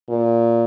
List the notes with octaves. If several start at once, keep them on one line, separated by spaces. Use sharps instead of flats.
A#2